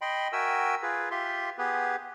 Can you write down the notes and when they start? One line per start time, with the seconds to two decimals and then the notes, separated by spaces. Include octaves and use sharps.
0.02 D#5 G5 B5 C6
0.33 F#4 A#4 E5 G5 G#5 E6
0.82 F4 G#4 B4
1.11 F4 G4 E5 C6
1.58 B3 G4 G#4 B4